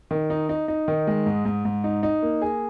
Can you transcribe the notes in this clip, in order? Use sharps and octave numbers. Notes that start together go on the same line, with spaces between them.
D#3
D#4
D#4
D#4
D#3
G#3
G#2
G#2
G#2
D#4
D#4
A#3
G#4